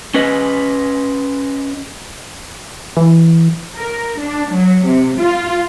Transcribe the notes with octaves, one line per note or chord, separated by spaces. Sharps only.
C#4 B4 D#5
E3
A#4
D4
F#3
C3
F4